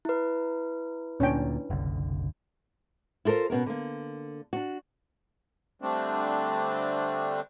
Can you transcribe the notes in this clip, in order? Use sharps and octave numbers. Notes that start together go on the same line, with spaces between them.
E4 B4
D2 A#2 C#4 D4 G5
F#1 C2 D3
E4 F4 A4 A#4 C5
B2 B3 C#4 A#4
D3 A#3
D4 F#4
D3 G3 A3 C4 D4